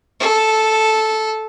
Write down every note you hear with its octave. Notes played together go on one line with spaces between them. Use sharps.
A4